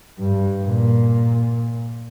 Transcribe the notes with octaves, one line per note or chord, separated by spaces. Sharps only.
G2
A#2